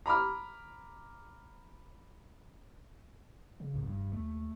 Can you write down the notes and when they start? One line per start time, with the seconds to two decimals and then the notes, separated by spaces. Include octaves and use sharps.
0.06 A#5 B5 D6 F6
3.60 C#3
3.74 C#2 A2
3.86 F1 G2
4.13 D#2 A3